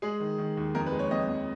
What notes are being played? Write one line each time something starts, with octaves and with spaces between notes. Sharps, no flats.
G#3 G#4
D#3
D#3
D#2
F2 A#4
B4
G#3
C#5
F2 D#5
F2